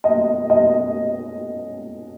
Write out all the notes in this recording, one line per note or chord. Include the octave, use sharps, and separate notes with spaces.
D#5
D#5